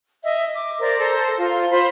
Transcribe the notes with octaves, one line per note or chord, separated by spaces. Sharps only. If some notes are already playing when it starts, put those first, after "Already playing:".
D#5 E5
D6
A#4 C5 D5
A4 C5 A#5
F4 F5
F4 C5 B5